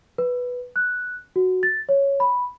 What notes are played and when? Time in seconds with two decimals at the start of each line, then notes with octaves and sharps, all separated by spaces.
0.18 B4
0.76 F#6
1.36 F#4
1.63 A6
1.89 C#5
2.20 B5